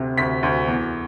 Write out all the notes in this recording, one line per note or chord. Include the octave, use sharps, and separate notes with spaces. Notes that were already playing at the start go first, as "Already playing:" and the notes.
Already playing: D2 C3
D2 B6
D2
E2